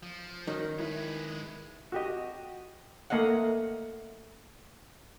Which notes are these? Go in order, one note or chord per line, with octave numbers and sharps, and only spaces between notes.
F3
D#3 C#4 D#4 F#4
G#3 E4 B4
F#4 G4 D#5
A3 A#3 D#5 F5 F#5